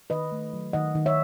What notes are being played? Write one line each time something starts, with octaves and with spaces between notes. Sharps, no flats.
D#3 B4 D#5
A3
F#3
D#3 D#5 F#5
D#3
C#5 E5